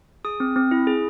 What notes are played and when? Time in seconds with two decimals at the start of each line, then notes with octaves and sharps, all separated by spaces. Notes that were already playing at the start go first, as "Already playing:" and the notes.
0.25 G#4 D#6
0.40 C4
0.56 C4
0.71 E4
0.87 G#4